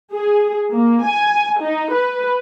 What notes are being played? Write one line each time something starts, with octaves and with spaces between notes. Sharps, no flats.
G#4
A#3
G#5
D#4
B4